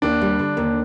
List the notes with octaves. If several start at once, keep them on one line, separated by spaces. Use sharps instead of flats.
D#2 D4
G3
D3
D#2